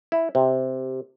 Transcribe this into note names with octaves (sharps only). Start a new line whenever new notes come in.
E4
C3